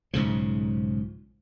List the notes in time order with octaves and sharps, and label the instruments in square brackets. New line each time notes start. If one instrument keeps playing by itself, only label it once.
[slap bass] B1 G#2 C#3 F3